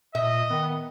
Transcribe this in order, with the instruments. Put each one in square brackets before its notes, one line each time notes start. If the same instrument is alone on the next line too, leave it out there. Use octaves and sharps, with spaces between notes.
[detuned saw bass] A#2 [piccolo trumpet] D#5 [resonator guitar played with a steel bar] E5
[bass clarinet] D#3 [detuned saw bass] B3